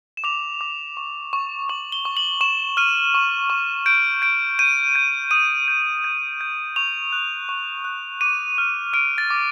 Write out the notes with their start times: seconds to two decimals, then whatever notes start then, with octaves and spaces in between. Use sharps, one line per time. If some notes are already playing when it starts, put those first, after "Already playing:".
0.17 E7
0.24 D6 F7
0.61 D6
0.97 C#6
1.33 C#6
1.69 C#6 F#7
1.92 G7
2.05 C#6
2.17 F#7
2.41 C#6 E7
2.77 F6 D#7
3.14 C#6
3.50 C#6
3.86 G6 D7
4.22 G6 D7
4.59 G6 D#7
4.95 G6
5.31 D#6 D#7
5.68 G6
6.04 G6
6.41 G6
6.76 C#6 F7
7.12 F#6
7.49 C#6
7.84 F#6
8.21 D6 D#7
8.58 F6
8.93 F6 D7
9.18 A6
9.30 D6